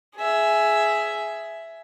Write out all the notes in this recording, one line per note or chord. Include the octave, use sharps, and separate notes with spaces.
G#4 E5